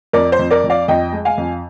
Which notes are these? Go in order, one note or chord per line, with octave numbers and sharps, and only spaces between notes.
F2 A#4 D5
C5
F2
A#4 D5
F2
D5 F5
F2 D#5 G5
G#3
F5 G#5
F2